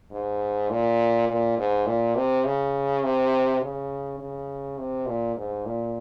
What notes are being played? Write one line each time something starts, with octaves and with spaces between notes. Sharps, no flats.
G#2
A#2
A#2
G#2
A#2
C3
C#3
C3
C#3
C#3
C3
A#2
G#2
A#2